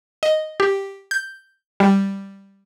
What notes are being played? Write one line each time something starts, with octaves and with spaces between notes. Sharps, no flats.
D#5
G4
G6
G3